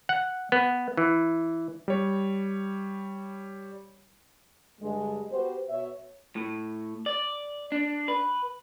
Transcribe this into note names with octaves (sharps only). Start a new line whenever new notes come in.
F#5
B3
E3
G3 C#5
G2 D3 G#3
B3 F#4 G4 B4 C5
B2 C#5 E5
A2
D5
D4
B4